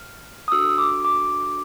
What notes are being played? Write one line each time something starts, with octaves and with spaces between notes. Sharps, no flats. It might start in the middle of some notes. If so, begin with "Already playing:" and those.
Already playing: F6
D#6
D4 F#4 A4 E6
D6
D6